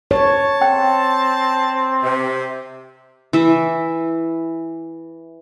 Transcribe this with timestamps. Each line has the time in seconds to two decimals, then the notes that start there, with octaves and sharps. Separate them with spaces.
0.11 C#5 A5
0.61 C4 G5
2.03 C3
3.33 E3 E5